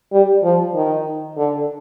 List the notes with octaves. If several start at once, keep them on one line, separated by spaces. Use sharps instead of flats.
G3
F3
D#3
D3